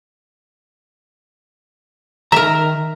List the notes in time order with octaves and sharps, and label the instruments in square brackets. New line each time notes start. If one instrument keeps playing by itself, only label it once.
[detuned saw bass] D#3 [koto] A#4 E5 [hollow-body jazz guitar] A#5